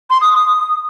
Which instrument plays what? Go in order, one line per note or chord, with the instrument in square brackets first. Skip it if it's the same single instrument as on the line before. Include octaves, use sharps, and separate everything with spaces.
[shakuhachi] C6
D#6
D#6